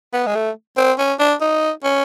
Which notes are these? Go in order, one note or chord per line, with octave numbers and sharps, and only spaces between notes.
B3
G#3
A3
C4
C#4
D4
D#4
C#4